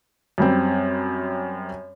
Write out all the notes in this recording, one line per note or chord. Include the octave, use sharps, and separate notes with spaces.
F#2 G3 C4